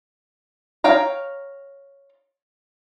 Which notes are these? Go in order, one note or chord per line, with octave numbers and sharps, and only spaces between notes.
C#5 F5 G5 A#5